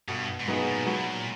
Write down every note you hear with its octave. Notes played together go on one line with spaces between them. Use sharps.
G2 B2
G#2
G2 F#3 B3 D#4 G#4
A#2
B2 F#3
A#2